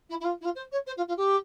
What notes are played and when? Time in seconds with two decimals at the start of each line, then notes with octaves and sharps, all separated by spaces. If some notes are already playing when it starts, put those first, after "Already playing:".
0.09 E4
0.20 E4
0.24 F4
0.41 E4
0.44 F4
0.55 C5
0.71 C#5
0.86 C5
0.97 F4
1.08 F4
1.17 G4